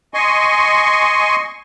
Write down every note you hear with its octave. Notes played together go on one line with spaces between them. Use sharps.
D#5 G#5 C6 C#6